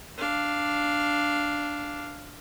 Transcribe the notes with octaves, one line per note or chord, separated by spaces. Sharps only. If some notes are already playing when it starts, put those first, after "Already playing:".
D4 F5